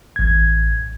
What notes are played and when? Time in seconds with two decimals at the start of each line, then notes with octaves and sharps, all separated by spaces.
0.16 A1 G#6